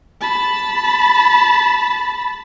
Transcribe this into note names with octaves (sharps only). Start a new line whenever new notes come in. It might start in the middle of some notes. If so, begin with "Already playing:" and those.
A5 B5